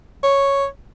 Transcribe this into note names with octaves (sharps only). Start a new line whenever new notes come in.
C#5